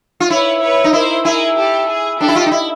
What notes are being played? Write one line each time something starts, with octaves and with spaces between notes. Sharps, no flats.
F4
E4 B4 C#5
B4 C#5
D#4
E4 A#4 C5
E4 G#4 A#4
G4 A4
G#4
D4 G4 A4
E4
F4
D#4
E4